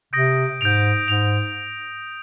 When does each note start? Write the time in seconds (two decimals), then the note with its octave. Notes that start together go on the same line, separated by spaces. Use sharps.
0.13 C3 D#6 G6 A#6 D7
0.61 G#2 G6 D7 F7
1.07 G#2 G6 D7 F7